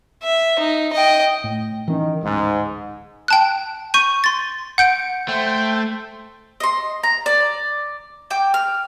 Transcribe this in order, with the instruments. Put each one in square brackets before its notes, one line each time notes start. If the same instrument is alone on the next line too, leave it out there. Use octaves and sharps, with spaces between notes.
[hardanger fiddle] E5
D#4
D#5 G5
[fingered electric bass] A2
[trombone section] D#3 [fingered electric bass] E3 C#4
[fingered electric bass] D1 [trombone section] G#2
[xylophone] G5 A5 F#6
C#6 G6 D#7
C6 A6
F#5 G6 D7
[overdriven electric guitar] A3 [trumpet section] C5 [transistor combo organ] G5
[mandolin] D#5 C6
A#5
D5
G5 D6
F6